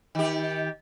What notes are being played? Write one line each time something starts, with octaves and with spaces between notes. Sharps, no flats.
D#3 G4